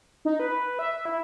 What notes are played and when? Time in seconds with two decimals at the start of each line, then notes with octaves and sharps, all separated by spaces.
0.25 D#4
0.40 B4
0.79 E5
1.05 E4